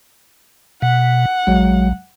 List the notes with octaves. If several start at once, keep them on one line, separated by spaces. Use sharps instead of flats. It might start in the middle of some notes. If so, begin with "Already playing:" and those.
B2 F#5
A#1 F#3 G#3